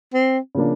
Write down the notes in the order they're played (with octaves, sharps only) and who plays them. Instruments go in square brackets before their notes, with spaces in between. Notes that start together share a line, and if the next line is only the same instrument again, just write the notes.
[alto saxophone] C4
[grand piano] C#3 F3 A#3 D4